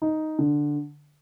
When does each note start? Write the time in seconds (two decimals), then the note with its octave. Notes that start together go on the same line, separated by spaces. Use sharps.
0.02 D#4
0.39 D3